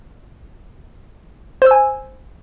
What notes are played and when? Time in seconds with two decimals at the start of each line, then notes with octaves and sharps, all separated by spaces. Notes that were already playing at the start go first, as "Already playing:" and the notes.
1.62 C5
1.66 E6
1.71 G#5